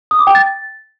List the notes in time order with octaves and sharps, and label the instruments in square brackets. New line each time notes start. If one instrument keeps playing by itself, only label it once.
[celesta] D#6
D6
G5
A6